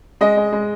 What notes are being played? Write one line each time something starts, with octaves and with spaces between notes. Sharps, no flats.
G#3 D#5
G#3
G#3